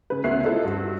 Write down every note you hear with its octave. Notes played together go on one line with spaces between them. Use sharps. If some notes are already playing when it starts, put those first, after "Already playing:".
C#3 B4
D2 B3 C#4 E5 F#6 C7
E4 F4 A4 C5 D#5
G2 F#4